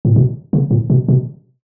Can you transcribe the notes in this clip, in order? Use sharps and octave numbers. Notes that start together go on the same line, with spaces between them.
A2
B2
C#3
A2
B2
B2